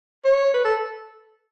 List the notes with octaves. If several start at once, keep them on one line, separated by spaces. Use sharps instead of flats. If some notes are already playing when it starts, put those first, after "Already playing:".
C#5
B4
A4